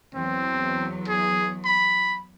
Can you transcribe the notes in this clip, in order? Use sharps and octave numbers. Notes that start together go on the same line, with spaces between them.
E2 F#3 C4
G#4
B5